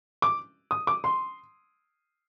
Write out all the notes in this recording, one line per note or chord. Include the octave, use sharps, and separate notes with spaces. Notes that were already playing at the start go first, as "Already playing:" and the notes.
D6
D#6
D6
C6